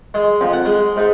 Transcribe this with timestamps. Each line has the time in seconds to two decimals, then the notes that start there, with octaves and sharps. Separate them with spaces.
0.14 G#3
0.41 F2
0.53 F#5
0.65 G#3
0.97 G#2